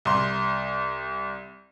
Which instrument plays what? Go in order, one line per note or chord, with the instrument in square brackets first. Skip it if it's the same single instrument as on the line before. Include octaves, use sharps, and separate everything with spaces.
[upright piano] C2 C6